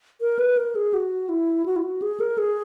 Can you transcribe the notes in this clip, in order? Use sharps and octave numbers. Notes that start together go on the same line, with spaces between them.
A#4
B4
A#4
G#4
F#4
E4
F#4
E4
F#4
G#4
A#4
G#4